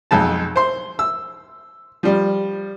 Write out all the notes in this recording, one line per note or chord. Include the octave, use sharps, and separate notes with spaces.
B1 F2 G#3 A5
C5 C6
E6
F3 G3